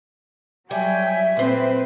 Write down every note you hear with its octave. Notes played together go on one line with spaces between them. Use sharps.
F#3 G3 E5 G5 G#5
A#2 C4 B4 C5